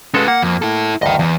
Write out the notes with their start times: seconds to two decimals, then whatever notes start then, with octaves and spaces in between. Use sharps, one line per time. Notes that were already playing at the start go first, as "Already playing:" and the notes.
0.14 G#3 C#4 F#4 A4 B4
0.28 A#3 F#5
0.43 F2
0.62 E4 A4
1.02 D2 G2 D#5 G5
1.19 E2